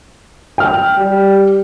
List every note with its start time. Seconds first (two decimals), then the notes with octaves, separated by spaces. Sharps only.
0.58 G5 F6
0.97 G3